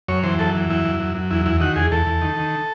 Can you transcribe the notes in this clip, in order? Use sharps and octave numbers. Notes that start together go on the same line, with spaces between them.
F#2 C#5
E3 C5
F#2 A4
E3
F#2 E4
F#2
F#2
F#2
E2 E4
E2 E4
D#3 F#4
E2 G#4
E2 A4
E2
D#3
D#3